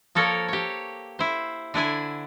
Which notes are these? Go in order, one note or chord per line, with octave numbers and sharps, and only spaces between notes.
F3 A#3 A4 A#4 C#5
G4 C#5
E4 C5
D3 D4 E4 G#5